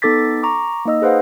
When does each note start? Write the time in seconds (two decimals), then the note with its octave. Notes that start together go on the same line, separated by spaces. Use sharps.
0.02 B3 D#4 A4 D6 A6 B6
0.43 A#5 C#6 D6
0.85 A#3 D#4 D#5 E6
1.02 G#4 B4 C5 F5 F#5